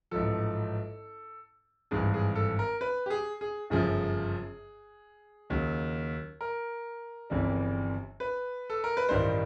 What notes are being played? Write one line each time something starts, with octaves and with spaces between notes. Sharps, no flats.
A1 G#2 F3 A4
G#1 G2 E3 G#4
G#4
A4
A#4
B4
G4
G#4
G#4
G1 F#2 C#3 F3 G#4
D#2 C#3 F#3
A#4
G1 F2 C#3 E3 G3
B4
A4
A#4
B4
A1 G2 D#3 G3 C5